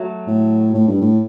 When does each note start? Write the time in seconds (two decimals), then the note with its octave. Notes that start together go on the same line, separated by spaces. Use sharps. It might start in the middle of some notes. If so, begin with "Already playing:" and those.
Already playing: F#3 A3
0.27 A2
0.74 A2
0.87 G2
1.01 A2